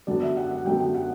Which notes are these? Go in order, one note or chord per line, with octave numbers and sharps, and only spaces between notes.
F#2 D3 F#3 B3 D5
E5
F#5
F#5
F#2 D3 F#3 B3 G5
G5
F#5